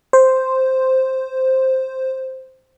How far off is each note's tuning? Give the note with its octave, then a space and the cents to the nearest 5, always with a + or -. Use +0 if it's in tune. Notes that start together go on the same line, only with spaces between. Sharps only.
C5 +0